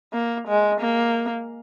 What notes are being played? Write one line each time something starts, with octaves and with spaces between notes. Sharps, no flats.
A#3
G#3
A#3